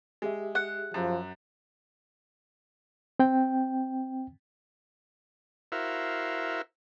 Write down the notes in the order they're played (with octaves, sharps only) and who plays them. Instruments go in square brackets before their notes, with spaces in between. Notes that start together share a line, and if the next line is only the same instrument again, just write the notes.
[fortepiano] G#3 [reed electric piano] G4 G#4 E5
[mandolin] F#5
[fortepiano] F#2 [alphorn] F3
[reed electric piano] C4 G5
[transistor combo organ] E4 F#4 A#4 C5 E5 F5